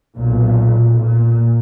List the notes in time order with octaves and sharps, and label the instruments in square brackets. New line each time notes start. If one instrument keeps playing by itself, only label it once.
[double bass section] B1 A#2
A#2